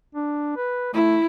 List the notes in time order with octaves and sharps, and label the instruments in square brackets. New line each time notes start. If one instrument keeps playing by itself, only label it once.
[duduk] D4
B4
[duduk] A3 [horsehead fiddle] E4